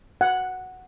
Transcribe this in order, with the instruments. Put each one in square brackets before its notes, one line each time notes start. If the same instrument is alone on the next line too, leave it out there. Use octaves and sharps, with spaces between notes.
[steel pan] F#5